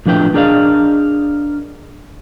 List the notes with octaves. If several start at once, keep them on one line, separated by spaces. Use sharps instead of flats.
A2 F3 D4 B4 G5
D4 G#4 A#4 D5 D#5 F5